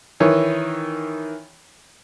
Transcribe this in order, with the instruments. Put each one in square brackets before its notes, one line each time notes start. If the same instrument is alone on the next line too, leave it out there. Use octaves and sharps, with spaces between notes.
[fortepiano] D#3 E3 C#5